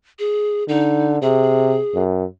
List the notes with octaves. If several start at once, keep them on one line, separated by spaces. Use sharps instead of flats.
G#4
D3 D#4
C3 G#4
F#2